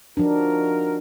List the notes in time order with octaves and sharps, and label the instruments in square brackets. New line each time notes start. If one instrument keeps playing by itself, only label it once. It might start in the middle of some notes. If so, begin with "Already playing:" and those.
[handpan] F3 D4 [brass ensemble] D#4 F#4 A#4